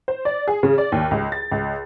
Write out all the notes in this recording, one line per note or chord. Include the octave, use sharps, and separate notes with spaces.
C5
D5
G#4
C#3
D5
D#2
C#2
A6
C#2